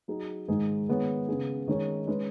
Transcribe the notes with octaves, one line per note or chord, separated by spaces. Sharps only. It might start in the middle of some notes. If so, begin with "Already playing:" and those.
F#3 D#4 G#4
G#2 D#3 G#3 D#4 G#4
D#3 G#3 B3 G#4 C#5
C#3 B3 G#4
D#3 G#3 C#4 G#4 C#5
G#3 C#4 B4